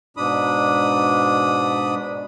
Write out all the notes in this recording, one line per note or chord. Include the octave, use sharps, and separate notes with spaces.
G#2 B2 D4 B5 D#6